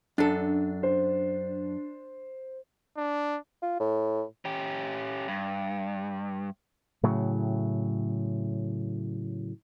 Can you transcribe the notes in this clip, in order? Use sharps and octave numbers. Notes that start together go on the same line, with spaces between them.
F#2 D4 A4
C5
D4
F4
A2
C#4 G4
G2
A2 C#3 F#3